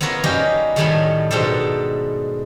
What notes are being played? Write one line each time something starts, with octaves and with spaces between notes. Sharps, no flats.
B3 E4 F4 A#4 C#5 F#5
G3 A#3 C#4 D#4 F#4 G4
A2 D#3 G3 A3 C#5 B5
G#2 B2 D4 G4 A4